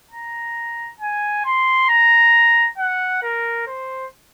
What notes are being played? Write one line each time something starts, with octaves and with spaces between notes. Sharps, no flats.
A#5
G#5
C6
A#5
F#5
A#4
C5